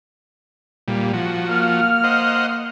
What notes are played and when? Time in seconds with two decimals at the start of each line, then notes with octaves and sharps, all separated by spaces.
0.88 A#2 G3
1.13 F3 F#4
1.49 A#3 F6
2.04 C5 D#5 F#5